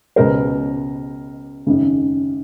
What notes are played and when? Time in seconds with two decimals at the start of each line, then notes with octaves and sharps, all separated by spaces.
0.16 C#2 B2 G#3 B3 A#4 C5
1.66 G#1 F#2 C#3